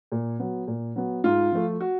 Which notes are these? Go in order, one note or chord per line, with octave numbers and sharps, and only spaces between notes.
A#2
F#3 B3
A#2
F#3 B3
G#2 F4
F3 A3
F#4